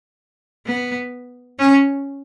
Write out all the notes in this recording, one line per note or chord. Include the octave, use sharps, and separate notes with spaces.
B3
C#4